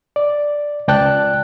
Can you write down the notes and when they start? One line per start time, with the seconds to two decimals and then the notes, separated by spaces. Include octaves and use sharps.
0.16 D5
0.88 C#2 D5 G5 A5 F#6